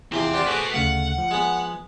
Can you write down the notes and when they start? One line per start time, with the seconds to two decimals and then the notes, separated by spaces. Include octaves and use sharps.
0.12 E2 C3 F3 C4 C6
0.34 F4 G4 C5 D5 F#5
0.47 A3 F#4 G#4 B4 C5 E5 D6 F#6
0.74 D2 C#3 A3 F5 F#5
1.18 F3
1.31 G#3 B3